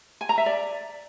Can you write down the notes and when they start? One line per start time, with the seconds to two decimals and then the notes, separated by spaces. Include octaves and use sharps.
0.21 G#5
0.29 A#5
0.38 E5
0.46 D5